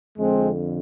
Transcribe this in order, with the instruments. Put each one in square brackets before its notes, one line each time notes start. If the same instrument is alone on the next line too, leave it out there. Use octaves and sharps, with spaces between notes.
[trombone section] F2 D3 G#3 C4